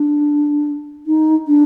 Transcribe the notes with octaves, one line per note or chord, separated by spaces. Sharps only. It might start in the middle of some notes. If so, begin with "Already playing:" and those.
Already playing: D4
D#4
D4